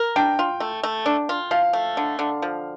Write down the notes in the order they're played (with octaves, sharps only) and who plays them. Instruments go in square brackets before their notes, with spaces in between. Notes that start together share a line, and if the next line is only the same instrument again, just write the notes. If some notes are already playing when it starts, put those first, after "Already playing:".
Already playing: [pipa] A#4
[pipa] D4 [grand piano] G5
[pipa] F4
A3
A3
D4
F4
[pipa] F3 [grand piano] F5
[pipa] A3
D3
D3
F3